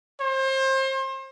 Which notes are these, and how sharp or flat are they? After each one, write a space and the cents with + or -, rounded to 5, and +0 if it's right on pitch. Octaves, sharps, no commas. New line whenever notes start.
C5 +30